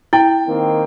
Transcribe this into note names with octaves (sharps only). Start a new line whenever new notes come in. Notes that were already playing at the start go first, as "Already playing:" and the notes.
E4 G5
D#3 A#3 C4